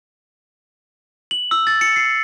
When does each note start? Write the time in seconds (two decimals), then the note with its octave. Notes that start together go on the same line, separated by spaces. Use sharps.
1.31 F#7
1.51 E6
1.67 A6
1.81 C#7
1.96 C7